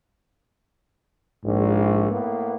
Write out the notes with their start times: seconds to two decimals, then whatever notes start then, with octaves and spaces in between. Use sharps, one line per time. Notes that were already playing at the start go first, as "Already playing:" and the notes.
1.45 A#1 G#2
2.10 A2 A#3 B3